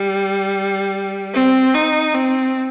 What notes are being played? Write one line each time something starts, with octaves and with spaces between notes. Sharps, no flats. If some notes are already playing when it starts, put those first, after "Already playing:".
Already playing: G3
C4
D#4
C4